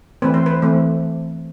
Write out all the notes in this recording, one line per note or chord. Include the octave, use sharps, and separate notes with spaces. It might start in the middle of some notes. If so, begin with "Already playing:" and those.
E3 A3 C4 B4
C5
B4
E3 A3 C4